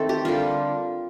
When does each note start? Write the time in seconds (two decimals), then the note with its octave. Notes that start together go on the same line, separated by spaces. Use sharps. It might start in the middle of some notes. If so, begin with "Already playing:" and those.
Already playing: D#3 A3 C4 A4
0.09 G4
0.25 D3 G3 A#3 F4